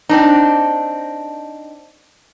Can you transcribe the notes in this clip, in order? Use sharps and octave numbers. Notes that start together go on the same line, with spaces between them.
C4 D4 D#4